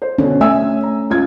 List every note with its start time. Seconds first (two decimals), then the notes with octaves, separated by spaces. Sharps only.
0.02 C5
0.18 B2 D3 C#4
0.41 A3 E5 G#5 E6
0.83 A#5
1.10 C#2 F4 G#6